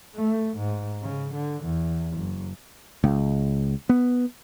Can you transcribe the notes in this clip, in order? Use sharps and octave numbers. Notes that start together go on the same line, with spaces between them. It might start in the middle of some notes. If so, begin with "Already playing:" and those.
A3
G#2
C#3
D3
E2
F#1
C#2
B3